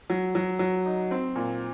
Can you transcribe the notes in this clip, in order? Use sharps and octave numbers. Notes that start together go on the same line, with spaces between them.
F#3
F#3
F#3
D#4
C4
A#2